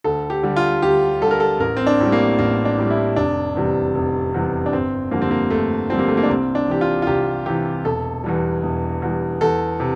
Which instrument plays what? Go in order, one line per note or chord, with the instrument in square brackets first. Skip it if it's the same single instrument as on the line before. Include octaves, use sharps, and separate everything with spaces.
[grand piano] D2 A4
G4
D3 G3
F4
D2 G4
D3 G3 A4
A#4
A4
A1 A#4
C4
D4
A2 G3
A#3
A1 A#3
D4
A2 G3
E4
F1 D4
E2 C3 G3
F1
E2 C3 G3
D4
G1 C4
F2 D3 G3 A#3
C4
A#3
G1 A3
F2 D3 G3 C4
A#3
A3
A#3
D4
C2 C4
D4
C3 E3 G4
F4
F4
C2 G4
C3 E3 G4
E1 A4
E2 E3 G3
E1
E2 E3 G3
E2 A4
C3